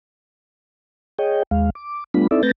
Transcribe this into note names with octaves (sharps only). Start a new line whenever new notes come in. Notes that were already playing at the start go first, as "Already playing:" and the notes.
G#4 C#5 D#5 G5
D#2 G#3 F5
D6
G3 A3 B3 D4 F4 B5
C4 D#4 E4 A4 D5 E5
A3 C4 B4 G6 A6 A#6